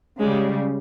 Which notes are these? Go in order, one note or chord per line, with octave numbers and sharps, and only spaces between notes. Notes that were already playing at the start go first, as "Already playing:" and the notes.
C#3 G3 G#3